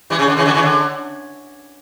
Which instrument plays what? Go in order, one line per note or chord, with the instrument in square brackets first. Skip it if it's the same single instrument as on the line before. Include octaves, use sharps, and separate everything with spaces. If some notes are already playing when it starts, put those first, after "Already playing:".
[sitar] E3 G3
C#3
D3
C#3 E3
D3 F#3
C#3 E3
D3